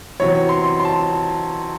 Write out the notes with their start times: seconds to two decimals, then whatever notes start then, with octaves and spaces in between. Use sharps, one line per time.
0.20 E2 C3 F#3 C#5
0.49 C6
0.63 C6
0.80 C6
0.85 A5